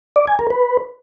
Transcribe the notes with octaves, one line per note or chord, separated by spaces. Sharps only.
D5
G#5
A#4
B4